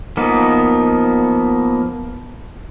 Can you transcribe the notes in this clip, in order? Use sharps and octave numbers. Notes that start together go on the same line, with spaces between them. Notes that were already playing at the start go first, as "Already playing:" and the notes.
F3 A#3 B3 D#4